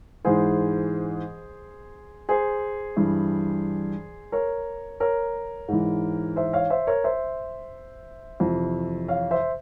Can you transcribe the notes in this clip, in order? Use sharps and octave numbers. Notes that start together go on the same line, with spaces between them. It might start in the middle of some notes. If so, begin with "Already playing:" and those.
G#2 E3 G#4 C5
G#4 C5
G2 E3
A#4 C#5
A#4 C#5
G#2 E3
C5 E5
C#5 F5
C5 E5
A#4 C#5
C5 E5
F2 C3 E3
C#5 F5
C5 E5